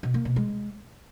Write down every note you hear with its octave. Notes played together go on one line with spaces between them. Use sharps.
B2
A#3
B2
G#3